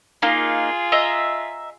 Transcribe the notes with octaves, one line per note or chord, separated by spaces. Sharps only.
A#3 D#4 F4 G#4
D#5 E5 A#5